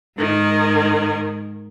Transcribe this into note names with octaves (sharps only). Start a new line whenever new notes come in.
G#2 D#3 A#4